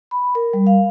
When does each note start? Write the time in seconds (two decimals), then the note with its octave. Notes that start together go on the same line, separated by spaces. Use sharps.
0.11 B5
0.35 A#4
0.53 G3
0.67 F5